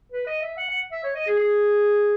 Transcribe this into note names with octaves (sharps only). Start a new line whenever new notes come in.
B4
D#5
E5
F#5
F#5
E5
C#5
D#5
G#4
G#4